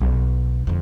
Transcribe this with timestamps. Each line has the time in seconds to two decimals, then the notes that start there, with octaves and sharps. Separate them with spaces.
0.01 B1
0.67 F2 D3